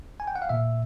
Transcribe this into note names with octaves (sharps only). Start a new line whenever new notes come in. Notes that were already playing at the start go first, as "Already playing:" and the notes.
G#5
G5
F#5
F5
A#2 E5